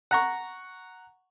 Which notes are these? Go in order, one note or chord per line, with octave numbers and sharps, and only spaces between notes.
F#5 A#5 C#6